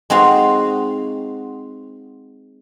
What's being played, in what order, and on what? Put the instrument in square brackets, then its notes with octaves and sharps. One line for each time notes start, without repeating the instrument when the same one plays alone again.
[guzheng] G#3 C4 D#4 F#4 F5